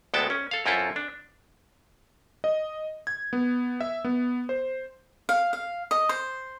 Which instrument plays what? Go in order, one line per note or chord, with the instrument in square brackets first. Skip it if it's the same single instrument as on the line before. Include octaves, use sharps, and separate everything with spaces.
[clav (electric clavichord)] D2 G#3 B3 A4 G5 A5
C#4
A4 F5
F#2 C4 E4 F4 A4 E5
D4
[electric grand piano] D#5
G#6
B3
E5
B3
C5
[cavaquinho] F5
F5
D#5
C5